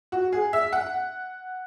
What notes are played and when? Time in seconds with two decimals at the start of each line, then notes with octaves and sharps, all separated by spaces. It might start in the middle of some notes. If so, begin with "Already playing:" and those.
0.12 F#4
0.32 G#4
0.53 E5
0.72 F#5